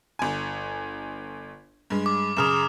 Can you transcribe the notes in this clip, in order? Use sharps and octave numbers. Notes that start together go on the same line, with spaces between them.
G1 G#5
G2 G#3
D6
F#2 C#3 D#6 F6 E7